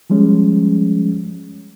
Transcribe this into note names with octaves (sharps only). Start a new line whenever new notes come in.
F3 G3 G#3 C#4